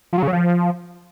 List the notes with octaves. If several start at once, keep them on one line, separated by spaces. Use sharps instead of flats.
F3
F#3
C#3
F#3
F3